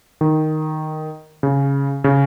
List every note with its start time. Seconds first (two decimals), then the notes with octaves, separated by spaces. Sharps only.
0.21 D#3
1.43 C#3
2.04 C#3